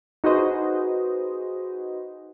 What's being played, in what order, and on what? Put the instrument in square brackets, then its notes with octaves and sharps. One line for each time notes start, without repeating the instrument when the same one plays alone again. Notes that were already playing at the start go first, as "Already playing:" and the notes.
[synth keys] D#4 F#4 G#4 B4 C5 D#5